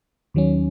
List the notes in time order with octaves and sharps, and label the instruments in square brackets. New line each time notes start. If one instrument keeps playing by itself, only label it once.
[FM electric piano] D#2 D#3 F#3 C#4